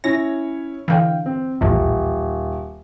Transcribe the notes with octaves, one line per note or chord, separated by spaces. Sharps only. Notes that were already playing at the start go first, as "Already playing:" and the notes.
C#4 E4 C#5 A#6
D3 E3 F5 G5
C4
D#1 A#1 E2 A2